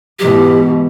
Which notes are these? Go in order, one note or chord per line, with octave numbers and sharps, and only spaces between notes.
G#2 B2 E3 G4